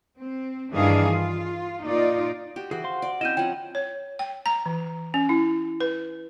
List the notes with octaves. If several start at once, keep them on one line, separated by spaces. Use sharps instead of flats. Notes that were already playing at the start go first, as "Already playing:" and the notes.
C4
G2 D#3 E3 D4 G#4 F5
F4
A#2 D#4 F4 D5
F#4 G4
E3 F#4 G#4
C5 F5 C6
D5
C4 C#4 E4 D#5 G6 D#7 E7
F3 C#5 F#5 G5
C#5
G5
A#5
E3
C#4
E4
B4